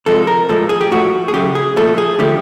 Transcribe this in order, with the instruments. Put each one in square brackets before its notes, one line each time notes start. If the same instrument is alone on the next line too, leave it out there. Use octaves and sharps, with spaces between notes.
[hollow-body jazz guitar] C3 F3 G#3 A4
A#4
A2 F3 G#3 A4
G#4
G4
A2 F3 A3 F#4
G#4
C#3 F#3 A3 G4
G#4
A#2 F3 A3 A4
G#4
D3 F3 A3 G4